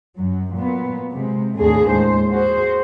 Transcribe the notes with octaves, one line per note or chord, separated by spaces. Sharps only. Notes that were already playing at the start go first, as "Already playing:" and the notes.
F#2 F#3
A#2 F#3 B3
C3 G#3
D#2 A2 A3 A#3 D4 G#4
D#2 G#3 C5
F#4 G#4 C5